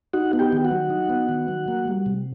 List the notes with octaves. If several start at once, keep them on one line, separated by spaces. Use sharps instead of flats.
D#4 F#4 F#5
B3
G4 G5
D#3
F#4 F#5
F#3
D#4
B3
D#3
F#3
A#3
G3
C3